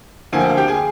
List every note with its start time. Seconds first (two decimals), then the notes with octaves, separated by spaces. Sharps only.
0.32 D2 D3 F3 A#3 G#5
0.40 G5
0.49 F5
0.57 G4 G5
0.68 G#4 G#5